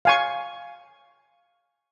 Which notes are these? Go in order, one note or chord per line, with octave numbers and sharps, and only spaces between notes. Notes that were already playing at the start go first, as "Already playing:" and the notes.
F5 G#5 C#6